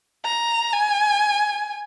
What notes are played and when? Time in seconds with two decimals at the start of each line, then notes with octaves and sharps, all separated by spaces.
0.25 A#5
0.73 G#5